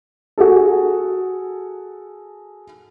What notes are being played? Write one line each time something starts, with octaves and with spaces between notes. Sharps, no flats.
F#4 G#4 A4